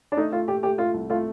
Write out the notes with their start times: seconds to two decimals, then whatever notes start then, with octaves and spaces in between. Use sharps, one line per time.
0.12 D4
0.17 A3 D#4
0.32 A3 F4
0.48 A#2 G4
0.63 A3 G4
0.78 A3 F4
0.94 C2
1.10 A3 F4